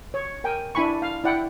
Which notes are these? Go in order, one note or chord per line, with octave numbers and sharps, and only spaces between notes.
C#5
A#4 G5 G#5
D4 E4 G#5 B5 C#6
F5
E4 D5 F#5 G5